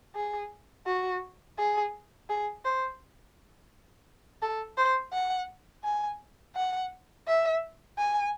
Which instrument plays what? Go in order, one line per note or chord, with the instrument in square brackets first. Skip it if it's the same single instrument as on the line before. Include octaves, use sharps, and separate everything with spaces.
[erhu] G#4
F#4
G#4
G#4
C5
A4
C5
F#5
G#5
F#5
E5
G#5